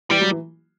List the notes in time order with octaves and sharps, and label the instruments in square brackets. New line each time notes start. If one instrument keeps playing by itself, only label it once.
[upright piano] E3 [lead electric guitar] G3
[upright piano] F#3
E3